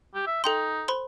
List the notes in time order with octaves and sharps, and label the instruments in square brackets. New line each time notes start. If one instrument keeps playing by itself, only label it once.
[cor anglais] G4
E5
[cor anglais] D#4 [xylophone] A4 G5 C6
[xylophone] C5 B5 C6